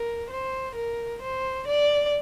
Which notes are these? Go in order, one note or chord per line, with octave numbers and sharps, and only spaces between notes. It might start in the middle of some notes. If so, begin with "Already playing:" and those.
Already playing: A#4
C5
A#4
C5
D5